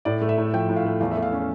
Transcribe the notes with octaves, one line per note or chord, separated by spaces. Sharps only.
A2 D5
A3
E5
A2
F3 G5
A2
F5
A3
E2 F5
E5
A3
F5
C#4